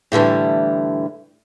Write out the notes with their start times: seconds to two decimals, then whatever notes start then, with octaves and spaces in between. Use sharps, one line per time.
0.12 A2 D3 E3 G3